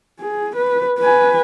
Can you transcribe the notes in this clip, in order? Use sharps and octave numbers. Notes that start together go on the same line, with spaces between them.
G#4
B4
B4 G#5